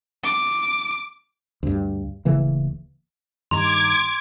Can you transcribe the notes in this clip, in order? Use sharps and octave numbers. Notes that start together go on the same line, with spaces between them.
D6
D2 G2
D1 C#3 E3 A#3
G2 D#3 A#5 C6 D6 G#6